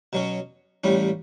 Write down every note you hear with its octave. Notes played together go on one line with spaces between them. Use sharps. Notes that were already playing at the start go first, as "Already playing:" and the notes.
B2 F#3 C#4
A1 A2 G3 C#4